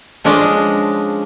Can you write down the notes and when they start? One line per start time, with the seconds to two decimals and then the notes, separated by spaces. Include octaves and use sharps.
0.24 F3 G#3 C#4 D4 D5 D#5